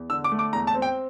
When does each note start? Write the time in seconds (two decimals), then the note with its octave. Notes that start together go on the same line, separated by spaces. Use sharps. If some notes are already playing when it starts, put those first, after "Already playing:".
Already playing: E2
0.10 D3 E6
0.24 D6
0.32 A3
0.39 D6
0.53 E2 A#5
0.67 A5
0.74 C4
0.82 G5